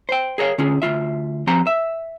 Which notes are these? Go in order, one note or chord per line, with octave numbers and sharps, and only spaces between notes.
C5 G5
G#4 A#4 C#5 F5
D3 C#4 F4 G#4
D2 D#3 F4 E5
F3 C4 G4 F#5 A#5 C6
E5